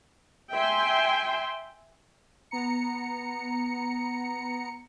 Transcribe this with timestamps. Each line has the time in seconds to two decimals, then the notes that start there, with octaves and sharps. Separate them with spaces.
0.52 E5 G5 G#5 C6
2.51 B3 A#5 C#7